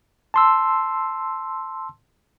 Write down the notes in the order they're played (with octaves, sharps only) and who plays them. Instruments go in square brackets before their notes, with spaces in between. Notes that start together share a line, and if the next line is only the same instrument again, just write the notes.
[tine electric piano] A5 C6 E6